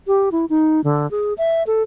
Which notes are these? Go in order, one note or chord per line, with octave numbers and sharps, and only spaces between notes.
G4
E4
D#4
D3
G#4
E5
A4